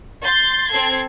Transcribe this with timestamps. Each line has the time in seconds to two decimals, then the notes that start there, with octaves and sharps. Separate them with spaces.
0.23 C6 G6 A6
0.71 C4 A4 G#6 C7